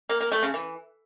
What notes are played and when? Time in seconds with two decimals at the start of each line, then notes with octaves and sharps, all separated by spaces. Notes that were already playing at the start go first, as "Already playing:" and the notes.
0.09 A#3
0.21 A#3
0.32 A3
0.43 C#3
0.54 E3